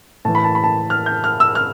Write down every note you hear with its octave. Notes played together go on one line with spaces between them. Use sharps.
A2 E3 A5
B5
A5
B5
A5
F6
G6
F6
E6
F6